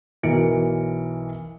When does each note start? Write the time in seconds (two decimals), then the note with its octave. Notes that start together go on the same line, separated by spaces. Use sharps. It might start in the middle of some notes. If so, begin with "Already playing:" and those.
0.23 B1 E3 A#4 C#7 D7